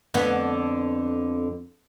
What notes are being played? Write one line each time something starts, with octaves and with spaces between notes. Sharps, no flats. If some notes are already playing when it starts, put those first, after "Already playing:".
F2 D3 B3